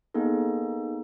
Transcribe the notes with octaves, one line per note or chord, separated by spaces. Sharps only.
A#3 B3 D#4 G#4 A4